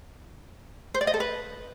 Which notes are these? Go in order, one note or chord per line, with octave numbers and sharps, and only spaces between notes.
C5
D5
D#5
A4
B4